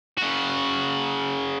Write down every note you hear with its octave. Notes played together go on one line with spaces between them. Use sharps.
C#3 F#4